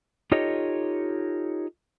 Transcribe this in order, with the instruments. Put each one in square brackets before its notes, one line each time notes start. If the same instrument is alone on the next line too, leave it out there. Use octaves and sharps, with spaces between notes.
[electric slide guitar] D#4 F4 G4 A4 C#5 D#5